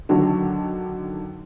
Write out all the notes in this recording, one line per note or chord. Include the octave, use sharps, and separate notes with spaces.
D3 D#3 F#3 F#4